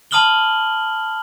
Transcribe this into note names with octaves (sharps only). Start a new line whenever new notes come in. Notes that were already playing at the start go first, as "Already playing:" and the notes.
A5 B5 D#6 F6 F#7 G7